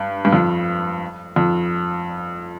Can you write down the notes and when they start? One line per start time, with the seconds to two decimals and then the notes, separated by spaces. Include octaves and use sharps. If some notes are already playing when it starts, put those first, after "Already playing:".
Already playing: G2
0.25 G2
0.33 F2
1.36 F2